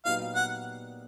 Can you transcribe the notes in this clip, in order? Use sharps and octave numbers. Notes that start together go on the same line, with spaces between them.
A#2 F#3 B3 D#4 G4 F5
F#5